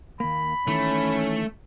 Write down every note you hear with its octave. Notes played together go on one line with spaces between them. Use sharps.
D#2 A#3 B5
D#3 E3 A3 C#4